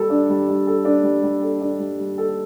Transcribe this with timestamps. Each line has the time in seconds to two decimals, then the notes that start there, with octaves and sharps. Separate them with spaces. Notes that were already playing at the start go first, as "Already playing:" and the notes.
Already playing: G3 A4
0.10 D4
0.29 G3
0.48 G3
0.67 A4
0.85 D4
1.04 G3
1.23 G3
1.43 A4
1.61 D4
1.79 G3
1.99 G3
2.18 A4